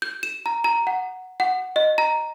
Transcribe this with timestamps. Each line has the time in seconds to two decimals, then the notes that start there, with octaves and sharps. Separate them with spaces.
0.02 G6
0.23 E7
0.46 A#5
0.64 A#5
0.87 F#5
1.40 F#5
1.76 D#5
1.98 A#5